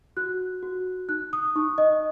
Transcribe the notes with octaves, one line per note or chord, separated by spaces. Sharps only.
F#4 F#6
F#4
D#4 F#6
D#6
D#4 C#6
D#5